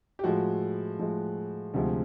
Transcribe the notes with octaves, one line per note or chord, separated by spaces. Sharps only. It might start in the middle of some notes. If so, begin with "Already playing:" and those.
G4
A2 F3 G#3 F#4
A2 F3 G#3
D2 C3 F3 G#3